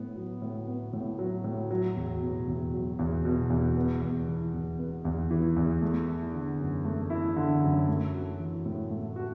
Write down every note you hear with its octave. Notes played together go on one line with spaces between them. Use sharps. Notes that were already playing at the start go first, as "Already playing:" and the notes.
Already playing: A2 B3
F#3
A2
B3
A2
F#3
A2
F#3
E2
B2
E2
F#3
E2
B2
E2
B3
E2
E3
E2
B3
E2
E3
E2
A3
E4
D3
F#2
A3
E4
D3
F#2
A3
F#4
E3
A2
A3
F#4